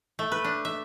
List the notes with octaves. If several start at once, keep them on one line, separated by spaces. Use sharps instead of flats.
A3
B4
D4
E5